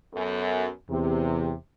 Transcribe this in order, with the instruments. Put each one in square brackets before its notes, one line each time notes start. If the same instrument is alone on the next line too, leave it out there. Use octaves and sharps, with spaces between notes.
[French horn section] F#2 B3 A4
[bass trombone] E2 [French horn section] C3